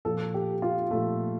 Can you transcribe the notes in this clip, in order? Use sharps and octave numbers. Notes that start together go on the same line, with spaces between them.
A#2 F3 A4
G4
F4
A#2 F3 A3